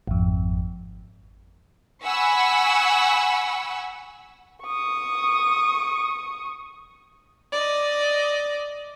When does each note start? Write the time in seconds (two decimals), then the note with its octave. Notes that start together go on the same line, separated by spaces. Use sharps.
0.08 G#1 F2
2.05 F#5 G#5 B5 C#6 E6
4.65 C#6 D#6
7.53 D5 D#5